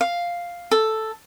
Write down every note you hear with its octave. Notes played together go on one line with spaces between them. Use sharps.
F5
A4